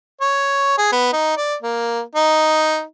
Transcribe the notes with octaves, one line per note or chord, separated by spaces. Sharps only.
C#5
G#4
B3
D#4
D5
A#3
D#4